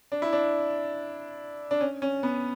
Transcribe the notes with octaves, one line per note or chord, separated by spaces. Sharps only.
D4
E4
D4
D4
C#4
C#4
B3